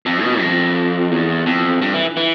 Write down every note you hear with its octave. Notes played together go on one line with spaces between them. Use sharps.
F2
B2
F2
E2
F2
G2
E3
E3